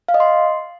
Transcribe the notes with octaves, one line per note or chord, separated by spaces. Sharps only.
F5
D#5
C6